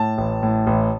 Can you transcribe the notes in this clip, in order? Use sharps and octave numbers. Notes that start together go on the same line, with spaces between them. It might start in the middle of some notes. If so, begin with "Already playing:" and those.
Already playing: A2 A5
A1
A2
A1